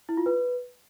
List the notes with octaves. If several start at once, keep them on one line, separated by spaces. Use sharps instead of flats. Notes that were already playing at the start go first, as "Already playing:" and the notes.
E4
F4
B4